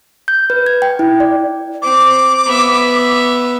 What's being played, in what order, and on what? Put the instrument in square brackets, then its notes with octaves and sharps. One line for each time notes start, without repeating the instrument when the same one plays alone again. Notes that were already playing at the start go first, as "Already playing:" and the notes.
[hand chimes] G6
B4
G#6
G5
E4
D5
[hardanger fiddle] C4 [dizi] D6
[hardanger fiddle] B3 E5